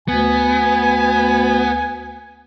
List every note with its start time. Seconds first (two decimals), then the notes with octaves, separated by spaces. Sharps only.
0.08 D2 B3 G#5